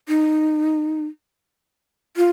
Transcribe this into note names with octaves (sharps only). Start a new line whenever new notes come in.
D#4
F4